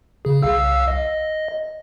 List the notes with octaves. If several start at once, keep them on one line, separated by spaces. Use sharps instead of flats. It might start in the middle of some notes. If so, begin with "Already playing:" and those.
C#3 G#4
C2 F5 E6
D#5